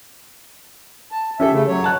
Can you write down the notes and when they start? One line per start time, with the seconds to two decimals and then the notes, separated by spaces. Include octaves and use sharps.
1.12 A5
1.40 C#4 G4 A4 E5
1.52 C#3 A3
1.68 F#3 C#5
1.84 A5 F#6